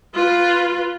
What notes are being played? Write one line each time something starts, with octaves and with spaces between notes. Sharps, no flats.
F4 B4